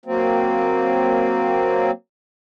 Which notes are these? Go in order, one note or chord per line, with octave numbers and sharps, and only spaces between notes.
F#3 A#3 C4